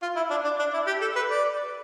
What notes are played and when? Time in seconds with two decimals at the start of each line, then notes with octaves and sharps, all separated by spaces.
0.02 F4
0.16 E4
0.30 D4
0.44 D4
0.59 D4
0.73 E4
0.87 G4
1.01 A4
1.15 B4
1.30 D5